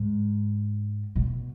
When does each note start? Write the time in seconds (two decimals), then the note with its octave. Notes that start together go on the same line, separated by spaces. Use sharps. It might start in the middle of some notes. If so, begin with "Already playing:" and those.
Already playing: G#2
1.16 B2